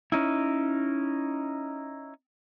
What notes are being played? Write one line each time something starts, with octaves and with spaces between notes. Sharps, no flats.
C#4 D#4 E4